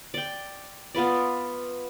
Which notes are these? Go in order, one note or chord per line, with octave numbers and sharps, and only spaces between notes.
D5 G5
B3 F4 B4 D5